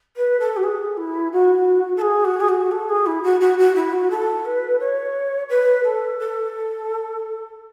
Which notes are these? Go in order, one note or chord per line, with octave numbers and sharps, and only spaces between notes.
B4
A4
F#4
G#4
E4
F#4
A4
G#4
F#4
G#4
F#4
A4
G#4
E4
F#4
F#4
F#4
E4
F#4
A4
B4
C#5
B4
A4
A4